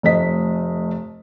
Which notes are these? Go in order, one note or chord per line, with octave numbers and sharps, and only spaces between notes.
F1 A3 D#5 B6